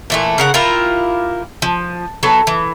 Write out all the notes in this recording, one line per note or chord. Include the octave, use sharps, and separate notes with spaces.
A#2 E3 A3
C#3 A#4 F#5
E4 F4 G4 A#4
F3
F#3 B3 A4
E3